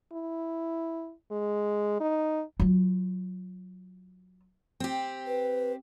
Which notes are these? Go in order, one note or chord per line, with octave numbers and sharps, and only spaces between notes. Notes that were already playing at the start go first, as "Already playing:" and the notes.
E4
G#3
D#4
F#3 F4
C4 G4
B4